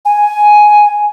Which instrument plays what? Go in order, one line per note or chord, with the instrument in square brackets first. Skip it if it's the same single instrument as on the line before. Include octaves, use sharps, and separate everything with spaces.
[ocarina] G#5